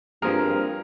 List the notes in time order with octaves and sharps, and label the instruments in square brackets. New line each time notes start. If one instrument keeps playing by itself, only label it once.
[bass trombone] G2 [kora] F3 G#4 [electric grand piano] A#3 C4 [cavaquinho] A#4